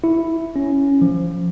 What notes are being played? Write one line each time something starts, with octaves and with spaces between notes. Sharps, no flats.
E4
C#4
F3